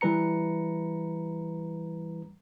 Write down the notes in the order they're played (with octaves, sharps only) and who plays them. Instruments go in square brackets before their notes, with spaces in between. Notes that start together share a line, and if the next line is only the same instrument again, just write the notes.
[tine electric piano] E3 G3 B4 A#5 C#7